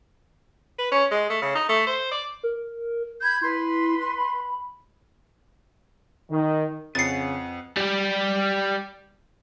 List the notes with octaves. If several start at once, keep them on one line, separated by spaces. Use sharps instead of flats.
B4
C#4
G#3
A3
C#3
D#4
A3
C5
D5
A#4
B5 G6 G#6
E4 B4 C6
B5
D#3
F2 C#3 B4 F#5 A6 C7
G3 G4